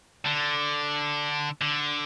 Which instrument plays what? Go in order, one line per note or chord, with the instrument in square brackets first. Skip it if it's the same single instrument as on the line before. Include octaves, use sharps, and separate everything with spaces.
[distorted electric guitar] D3
D3